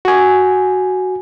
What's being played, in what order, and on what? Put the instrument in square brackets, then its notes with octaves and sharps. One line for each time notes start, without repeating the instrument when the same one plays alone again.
[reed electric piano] F#4 G#5